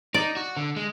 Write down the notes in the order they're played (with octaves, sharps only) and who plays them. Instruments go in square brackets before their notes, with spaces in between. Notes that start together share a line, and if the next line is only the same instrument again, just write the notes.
[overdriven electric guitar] D#4 [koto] D5
[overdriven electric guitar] F#4
D3
G#3